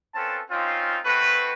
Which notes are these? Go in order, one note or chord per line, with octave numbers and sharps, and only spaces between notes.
C4 C#4 F4 A4 B4 A5
C4 C#4 D#4 F4
A3 C4 F#4 B4